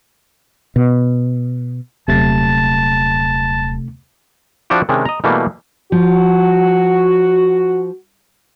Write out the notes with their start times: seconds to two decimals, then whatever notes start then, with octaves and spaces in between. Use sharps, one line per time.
0.76 B2
2.08 D#1 C3 F#3 A3 A5 A6
4.70 F3 D4 E4 F#4 G4
4.89 C3 D#3 G#3 C#4 D4
5.06 D#5 A#5
5.24 B2 E3 G3 A3 A#3 E4
5.92 F3 F#4